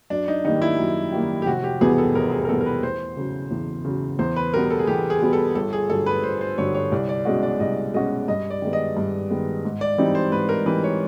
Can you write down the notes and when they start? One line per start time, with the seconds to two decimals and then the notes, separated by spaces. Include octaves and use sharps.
0.10 F#2 D4
0.28 D#4
0.44 D#3 G3 A#3 D#4
0.62 E4
0.79 F#2
1.12 D#3 G3 A#3
1.42 G4
1.46 F1 F#4
1.64 G4
1.81 E2 B2 G3 B3 G#4
1.98 A4
2.15 F1 A#4
2.32 G#4
2.45 A#4
2.49 E2 B2 G3 B3 A4
2.61 A#4
2.66 B4
2.83 E2 C5
3.17 C#3 F#3
3.51 E2
3.85 C#3 F#3
4.19 E2 C5
4.36 B4
4.54 B2 G3 B3 A#4
4.70 A4
4.79 G#4
4.87 E2 G4
5.10 G#4
5.21 B2 G3 B3
5.33 A4
5.55 G1 A4
5.73 G#4
5.90 G2 D3 F#3 A4
6.06 B4
6.23 G1 C5
6.41 C5
6.58 G2 D3 F#3 C#5
6.75 C#5
6.92 C2 D5
7.09 D5
7.25 B2 G#3 C#4 F#4 D#5
7.43 D5
7.60 C2 D#5
7.94 B2 G#3 C#4 F#4 D#5
8.28 G2 D#5
8.50 D5
8.62 D#3 G#3 B3
8.73 D#5
8.97 G2
9.30 D#3 G#3 B3
9.65 G#2
9.81 D5
9.98 E3 G3 C4 D#4
10.15 C5
10.32 G#2 B4
10.49 A#4
10.66 E3 G3 C4 D#4 B4
10.84 C#5